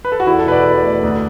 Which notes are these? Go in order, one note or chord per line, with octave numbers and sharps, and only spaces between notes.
B4
A4
F#4
E2 E4
A4
B2 B4
D5
E2 D5
A3
D2